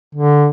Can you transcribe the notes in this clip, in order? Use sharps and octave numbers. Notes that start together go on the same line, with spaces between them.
D3